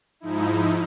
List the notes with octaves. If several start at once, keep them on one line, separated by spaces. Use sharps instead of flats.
G#2 F3 D#4 E4